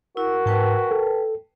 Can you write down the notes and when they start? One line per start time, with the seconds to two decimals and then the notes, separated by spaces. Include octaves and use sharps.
0.17 E4 F#4 A#4
0.46 G#2 B4 G5 A5
0.91 A4